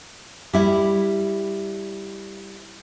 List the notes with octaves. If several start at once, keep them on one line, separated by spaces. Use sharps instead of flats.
G3 E4